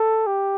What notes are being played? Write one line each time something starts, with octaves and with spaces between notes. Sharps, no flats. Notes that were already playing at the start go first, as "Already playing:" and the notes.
Already playing: A4
G4